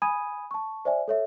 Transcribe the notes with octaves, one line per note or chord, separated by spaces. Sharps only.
G#5 B5 D#6 G#6 D#7
A5 C#6
C5 D5 E5 G#5
A4 C#5 E5